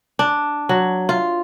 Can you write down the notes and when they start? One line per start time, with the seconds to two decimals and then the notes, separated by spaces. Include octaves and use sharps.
0.19 D4
0.69 F#3
1.09 F4